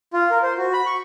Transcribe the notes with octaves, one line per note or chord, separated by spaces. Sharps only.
F4
A#4
C5
F#4
B5
C#6